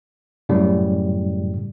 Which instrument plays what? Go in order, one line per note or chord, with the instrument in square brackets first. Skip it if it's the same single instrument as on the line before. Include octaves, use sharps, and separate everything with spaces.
[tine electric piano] F#2 A2 C#3 G3